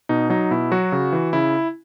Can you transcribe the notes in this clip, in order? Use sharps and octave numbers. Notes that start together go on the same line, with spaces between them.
B2 D#4
F#3 D#4
B2 E4
F#3 F#4
C#3
E3
C#3 E4